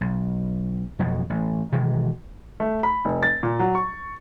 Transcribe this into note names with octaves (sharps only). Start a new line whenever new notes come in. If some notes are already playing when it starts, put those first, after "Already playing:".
B1
F2 B2 F3 F#3
A1
B2 D#3 E3 G#3
A3
B5
F1
A6
A#2
F#3
C#6